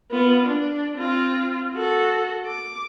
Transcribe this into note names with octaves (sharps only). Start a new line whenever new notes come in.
B3 F4
D4
C4 F4
F#4 A4
D6